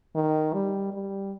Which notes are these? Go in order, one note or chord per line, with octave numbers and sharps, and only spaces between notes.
D#3
G3
G3